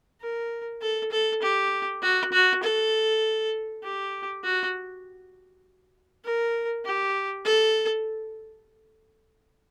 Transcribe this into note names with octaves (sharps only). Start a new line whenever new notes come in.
A#4
A4
A4
G4
F#4
F#4
A4
G4
F#4
A#4
G4
A4